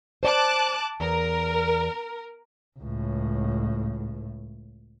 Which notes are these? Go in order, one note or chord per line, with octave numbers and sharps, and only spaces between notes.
C5 D5 A5 D6 F#6
E2 A#4
C#2 A2